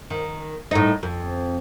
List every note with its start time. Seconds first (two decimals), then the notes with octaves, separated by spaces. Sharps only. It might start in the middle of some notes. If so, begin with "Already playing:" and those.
0.10 D#3
0.71 A2 D#4
1.03 F2